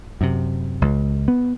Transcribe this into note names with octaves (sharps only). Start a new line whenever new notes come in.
F#2 C3
C#2
B3